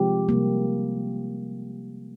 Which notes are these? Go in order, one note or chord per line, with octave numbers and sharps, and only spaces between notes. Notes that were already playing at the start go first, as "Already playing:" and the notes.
Already playing: C3 F3 G#3 C4 G4
C3 G3 A#3